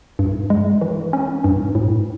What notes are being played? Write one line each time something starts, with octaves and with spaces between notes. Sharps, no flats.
G2
G#3
E3
C#4
G2
A2